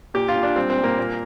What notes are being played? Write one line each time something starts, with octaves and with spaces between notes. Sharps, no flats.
A#2 G4
F4
A#2
D4
G3 C4
C4
A#2
A#3
A#2